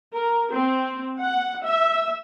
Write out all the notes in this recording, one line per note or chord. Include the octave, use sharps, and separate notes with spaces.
A#4
C4
F#5
E5